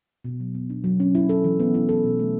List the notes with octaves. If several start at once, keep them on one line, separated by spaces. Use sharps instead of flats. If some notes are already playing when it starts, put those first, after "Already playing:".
B2
F#3
B3
D4
F#3
C#4
E4
A4
E3
B3
E4
A4
B2
A3